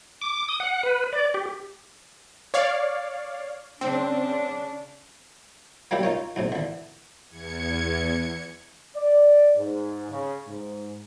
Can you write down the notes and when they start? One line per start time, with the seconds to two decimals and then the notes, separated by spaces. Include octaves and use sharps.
0.22 D6
0.49 D#6
0.60 F#5
0.83 B4
1.13 D5
1.34 G4
2.54 C#5 D5 F5
3.81 C#3 C4 D4
5.91 F#3 G3 A#3 E4 G4
6.03 D#4 F4 C#5
6.36 B1 A2 C3
6.52 D3 E3
7.30 E2 G#6 C#7
8.96 D5
9.56 G#2
10.10 C#3
10.47 G#2